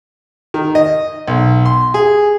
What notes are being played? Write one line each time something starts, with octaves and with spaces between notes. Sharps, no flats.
D#3
D#5
B1
C6
G#4